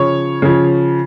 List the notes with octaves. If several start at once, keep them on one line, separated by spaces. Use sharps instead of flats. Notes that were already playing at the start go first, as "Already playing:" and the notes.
Already playing: C#3 F3 C#5
C#3 F3